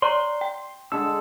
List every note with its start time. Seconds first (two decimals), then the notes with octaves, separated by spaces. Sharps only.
0.02 C#5 D5 A#5 C6
0.41 G5
0.92 D3 G#3 A4 E6